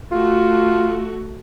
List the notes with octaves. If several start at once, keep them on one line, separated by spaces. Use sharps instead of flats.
A3 F4 F#4